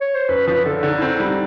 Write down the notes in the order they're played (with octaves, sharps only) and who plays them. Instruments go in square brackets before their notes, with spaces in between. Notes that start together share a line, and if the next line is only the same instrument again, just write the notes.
[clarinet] C#5
C5
[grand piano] F#2 [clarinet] B4
[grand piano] F3 [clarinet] B4
[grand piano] D3 [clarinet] A4
[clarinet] A4
[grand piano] D3
[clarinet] D#4
[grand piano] C4 [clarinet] E4
[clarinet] D#4
[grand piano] G3 [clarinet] E4
[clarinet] D#4